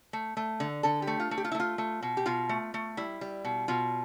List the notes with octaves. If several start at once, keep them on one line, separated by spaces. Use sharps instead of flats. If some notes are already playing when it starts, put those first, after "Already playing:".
A3
A3
D3
D3 A4
G4
A3
F4
A3
G4
F4
E4
A3
F4
A3
B2
G4
B2 F4
A3
A3
G3 E4
G3
B2
B2 F4